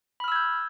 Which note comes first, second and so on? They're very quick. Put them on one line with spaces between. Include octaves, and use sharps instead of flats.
B5 F6 E6 G#6 G6